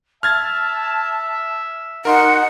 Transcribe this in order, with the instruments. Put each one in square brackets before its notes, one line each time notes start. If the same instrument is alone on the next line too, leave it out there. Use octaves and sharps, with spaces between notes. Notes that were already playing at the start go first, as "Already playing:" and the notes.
[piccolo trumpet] E5 [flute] A5 [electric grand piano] F6 G#6 A6
[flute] D#4 [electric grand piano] A#4 C6 [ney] F#5